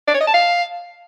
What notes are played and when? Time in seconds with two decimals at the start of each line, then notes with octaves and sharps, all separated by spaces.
0.07 D5
0.14 C#5
0.21 D#5
0.27 A5
0.34 F5